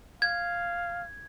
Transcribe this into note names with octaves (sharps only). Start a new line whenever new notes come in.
F5 G#6